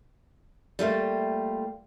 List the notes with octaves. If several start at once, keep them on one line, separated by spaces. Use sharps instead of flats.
G3 A3 A#3 F4